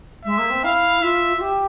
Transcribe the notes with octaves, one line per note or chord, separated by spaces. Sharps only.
G#3 E5
A#3
C4
E4 F5
F4 E5
F4
G4